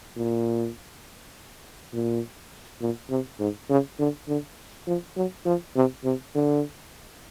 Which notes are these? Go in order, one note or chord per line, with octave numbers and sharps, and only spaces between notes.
A#2
A#2
A#2
C3
G#2
C#3
D3
D3
F3
F#3
F3
C3
C3
D3